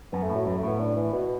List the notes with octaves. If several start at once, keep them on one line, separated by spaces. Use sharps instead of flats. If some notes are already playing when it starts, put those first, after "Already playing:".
F#2 B3
A3
A2
F#3
F#2 F#3
A3
A2 B3
D4
E3
B2